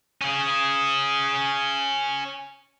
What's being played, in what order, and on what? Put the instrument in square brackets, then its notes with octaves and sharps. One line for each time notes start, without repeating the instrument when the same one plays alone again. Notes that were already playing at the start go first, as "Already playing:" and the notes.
[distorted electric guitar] C#4 G#4